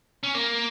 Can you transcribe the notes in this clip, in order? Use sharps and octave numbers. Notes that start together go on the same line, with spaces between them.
C#4
A#3